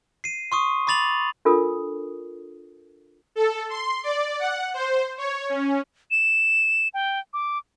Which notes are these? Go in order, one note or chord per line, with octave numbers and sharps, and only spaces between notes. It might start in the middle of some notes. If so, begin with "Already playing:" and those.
C7 D#7
C6 C#6 D#6
B5 D6 A6 F7 F#7
D4 F4 A4 A#4 D#6
A4
C6
D5
F#5
C5
C#5
C#4
E7
G5
D6